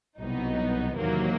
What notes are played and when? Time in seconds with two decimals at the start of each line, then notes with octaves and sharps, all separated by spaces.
0.18 C2 B2 F#3 B3 D#4
0.95 E2 C3 D#3 F#3 A#3